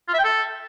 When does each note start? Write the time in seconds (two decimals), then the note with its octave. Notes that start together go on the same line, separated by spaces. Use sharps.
0.08 F4
0.14 E5
0.19 G5
0.24 A4